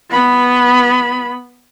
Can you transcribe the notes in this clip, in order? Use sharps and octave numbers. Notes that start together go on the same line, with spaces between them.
B3 B5